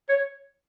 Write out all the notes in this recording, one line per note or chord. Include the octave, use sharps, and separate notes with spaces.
C#5